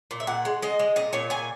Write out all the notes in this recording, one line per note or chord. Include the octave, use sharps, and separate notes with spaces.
A#2
E5
A#2 F#5
G#3
G#3 D#5
G#3
A#2 D#5
A#2 C#5
A#2 G#5